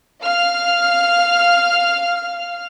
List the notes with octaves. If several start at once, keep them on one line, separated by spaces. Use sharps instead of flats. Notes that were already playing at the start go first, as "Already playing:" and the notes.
F5 F6